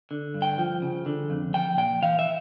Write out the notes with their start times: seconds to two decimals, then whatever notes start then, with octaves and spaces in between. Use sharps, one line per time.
0.11 D3
0.34 G2
0.42 G5
0.58 F3
0.82 C#3
1.06 D3
1.30 F2
1.54 F3 G5
1.78 A#2 G5
2.02 E3 F5
2.19 E5